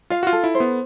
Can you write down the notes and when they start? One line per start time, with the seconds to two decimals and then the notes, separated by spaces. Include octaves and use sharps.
0.10 F4 F5
0.23 F#4
0.27 F4
0.33 A4
0.44 E4
0.55 C5
0.60 B3